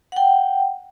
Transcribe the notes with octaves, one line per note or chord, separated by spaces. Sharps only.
F#5 G5